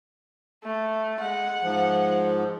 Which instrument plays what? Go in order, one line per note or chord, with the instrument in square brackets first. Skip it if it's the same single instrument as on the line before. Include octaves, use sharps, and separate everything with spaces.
[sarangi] A3
[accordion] G#3 [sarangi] F#5
[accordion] G#2 F3